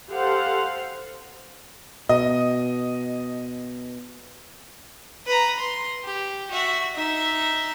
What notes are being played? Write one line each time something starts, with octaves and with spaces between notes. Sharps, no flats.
G4 A4 C5 F5 F#5
B2 D#5
B4 A#5
C6
G4
F#4 E5
D#4 E5